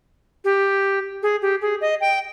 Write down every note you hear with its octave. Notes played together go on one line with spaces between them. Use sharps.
G4
G#4
G4
G#4
D#5
G5